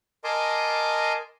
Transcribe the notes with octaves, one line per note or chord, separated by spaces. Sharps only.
A#4 D#5 G#5 A5 C6 D6